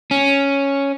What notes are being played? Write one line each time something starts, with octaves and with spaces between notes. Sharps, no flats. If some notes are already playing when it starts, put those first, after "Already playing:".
C#4